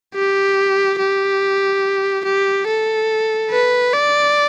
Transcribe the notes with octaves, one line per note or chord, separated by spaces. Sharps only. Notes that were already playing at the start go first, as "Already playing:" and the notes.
G4
G4
G4
A4
B4
D5